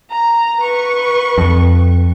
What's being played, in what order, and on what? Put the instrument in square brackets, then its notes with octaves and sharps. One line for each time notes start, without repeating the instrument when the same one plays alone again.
[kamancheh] A#5
B4 C#6
[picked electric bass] F2